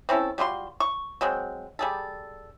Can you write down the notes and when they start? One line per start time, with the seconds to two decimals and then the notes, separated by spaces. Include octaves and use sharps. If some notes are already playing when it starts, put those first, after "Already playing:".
0.09 C4 C#4 E4 A4
0.38 G3 F4 F#4 C6
0.80 C#6
1.21 F#3 G#3 C4
1.79 G3 G#4 A4